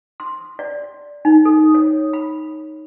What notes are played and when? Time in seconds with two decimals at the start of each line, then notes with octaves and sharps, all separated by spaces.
0.20 C6
0.59 D5
1.25 D#4
1.45 A4
1.75 C#5
2.13 B5